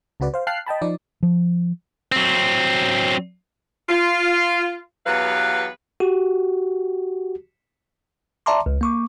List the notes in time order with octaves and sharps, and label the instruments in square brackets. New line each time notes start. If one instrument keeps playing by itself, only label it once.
[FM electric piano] C#2 C#3 F#4 B4 D5
C5 F5
F5 G5 A5 F6 F#6 C7
D#5 G5 A5 B5
F3 D#4 D5
[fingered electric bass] F3
[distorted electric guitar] F#3 C4
[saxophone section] F4
E2 F#3 B3 G4 B4 F5
[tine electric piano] F#4 G4
D5 E5 A5 A#5 C6 D6
C#2
A#3 C#6 D6